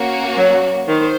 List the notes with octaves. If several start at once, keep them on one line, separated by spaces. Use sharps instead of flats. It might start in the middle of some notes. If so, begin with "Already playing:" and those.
Already playing: A#3 C#4 F#4
F#3
D#3 C5